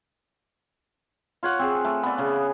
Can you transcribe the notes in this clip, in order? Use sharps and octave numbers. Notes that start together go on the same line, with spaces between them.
F4 C#5 F#5
C4 G#4
A3
B3 D5
C#3 G#4